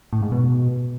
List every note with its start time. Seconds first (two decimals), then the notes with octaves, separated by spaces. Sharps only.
0.13 A2
0.22 G#2
0.32 B2